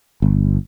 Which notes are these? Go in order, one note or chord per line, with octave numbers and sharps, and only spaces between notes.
G1